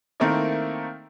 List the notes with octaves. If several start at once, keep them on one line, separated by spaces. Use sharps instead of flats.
D#3 A3 A#3 C4 D#4 E4